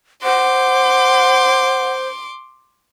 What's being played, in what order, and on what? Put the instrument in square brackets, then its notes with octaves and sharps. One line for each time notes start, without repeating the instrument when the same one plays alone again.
[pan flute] C5 [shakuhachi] F#5 [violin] C6 D6